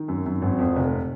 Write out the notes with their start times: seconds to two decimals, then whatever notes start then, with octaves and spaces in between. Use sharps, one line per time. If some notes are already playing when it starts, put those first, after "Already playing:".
Already playing: D#3
0.08 F#2
0.26 F#2
0.42 G#1
0.59 F2
0.76 F1